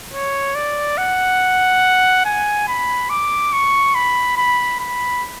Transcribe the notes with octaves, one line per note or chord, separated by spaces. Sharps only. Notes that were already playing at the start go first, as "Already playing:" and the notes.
C#5
D5
F#5
G#5
B5
D6
C#6
B5
B5
B5